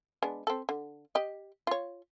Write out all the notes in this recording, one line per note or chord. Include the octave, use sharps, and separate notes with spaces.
G#3 B3 D4
C4 A4
D3
G4 D#5
F4 C#5